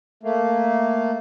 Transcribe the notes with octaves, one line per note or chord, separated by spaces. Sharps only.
A3 A#3